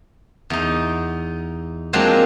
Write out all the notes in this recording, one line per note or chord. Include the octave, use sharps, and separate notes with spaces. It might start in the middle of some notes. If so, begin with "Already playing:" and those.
E2 D#4
F3 F#3 G#3 A#3 C4 D4